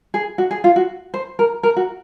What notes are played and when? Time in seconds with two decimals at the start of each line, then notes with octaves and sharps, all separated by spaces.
0.14 G#4
0.38 F#4
0.51 G#4
0.64 F4
0.76 F#4
1.14 C5
1.39 A#4
1.63 A#4
1.76 F#4